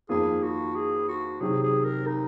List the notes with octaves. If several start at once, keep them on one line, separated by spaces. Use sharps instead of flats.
F2 D#3 A#3 F4 G#4
F#4
G#4
F#4
C3 D#3 F#3 G#4
G#4
A#4
D#4